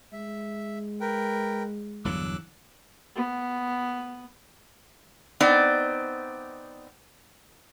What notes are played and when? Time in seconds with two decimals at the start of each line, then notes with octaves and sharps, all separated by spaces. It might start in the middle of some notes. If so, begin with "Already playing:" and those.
0.13 G#3 E5
1.01 A#4 B4 G5
2.05 G1 E2 F#3 D6 E6 F#6
3.16 B3
5.40 B3 C4 D#4 D5